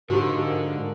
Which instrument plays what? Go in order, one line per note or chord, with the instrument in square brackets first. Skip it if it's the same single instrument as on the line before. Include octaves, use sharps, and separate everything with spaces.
[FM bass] G#2 [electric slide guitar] D3 [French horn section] F3 G#3 A#4 [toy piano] F#4 G4